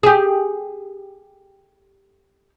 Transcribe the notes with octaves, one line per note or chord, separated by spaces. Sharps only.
G4 G#4